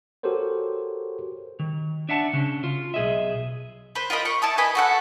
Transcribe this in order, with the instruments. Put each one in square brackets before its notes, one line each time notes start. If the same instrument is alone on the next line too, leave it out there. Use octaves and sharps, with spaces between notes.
[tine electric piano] F#4 G4 A4 A#4 C5 C#5
[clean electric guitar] D#3
D4 E5 F#5 A5
C#3 C#4 D4
F4
B1 G#4 D#5 E5
[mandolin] B4 C5
F4 A#4 D#5 B5
C#6
E4 A5 D#6
B4 D#5 G#5 B5
F#4 A4 F#5